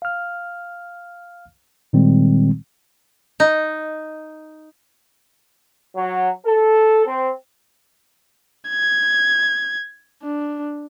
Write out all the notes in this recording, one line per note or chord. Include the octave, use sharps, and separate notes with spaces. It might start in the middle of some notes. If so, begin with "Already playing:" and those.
F5 F6
A#2 D#3 G3 G#3 C4
D#4
F#3
A4
C4
G#6
D4